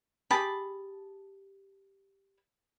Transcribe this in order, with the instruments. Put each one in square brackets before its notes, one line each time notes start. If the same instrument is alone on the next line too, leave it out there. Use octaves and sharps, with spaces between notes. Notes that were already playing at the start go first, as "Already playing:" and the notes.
[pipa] G4 G#4 A5 B5